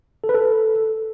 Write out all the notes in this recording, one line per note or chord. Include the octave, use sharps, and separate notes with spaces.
A4
B4
A4